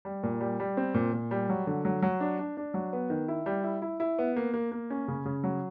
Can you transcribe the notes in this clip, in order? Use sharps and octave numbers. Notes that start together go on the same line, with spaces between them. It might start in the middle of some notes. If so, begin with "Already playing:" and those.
G3
A#2
G3
G3
C4
A#2
A#2
G3
F#3
D3
F#3
F#3
D4
D4
D4
F#3
B3
D#3
E4
G3
E4
E4
E4
B3
A#3
A#3
A#3
C#4
C#3
C#3
F#3